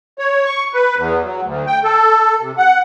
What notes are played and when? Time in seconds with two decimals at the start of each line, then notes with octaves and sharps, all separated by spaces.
0.19 C#5
0.45 C#6
0.74 B4
0.97 E2
1.23 F#3
1.43 D2
1.67 G5
1.83 A4
2.40 C3
2.58 F#5